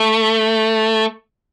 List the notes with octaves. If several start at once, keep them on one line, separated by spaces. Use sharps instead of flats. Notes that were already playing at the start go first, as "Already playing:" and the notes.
Already playing: A3